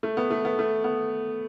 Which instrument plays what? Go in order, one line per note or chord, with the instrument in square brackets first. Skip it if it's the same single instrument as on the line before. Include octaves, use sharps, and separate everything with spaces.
[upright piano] A3
B3
A3
B3
A3
B3